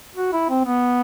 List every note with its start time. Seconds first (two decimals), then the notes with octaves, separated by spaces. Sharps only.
0.15 F#4
0.33 E4
0.49 C4
0.65 B3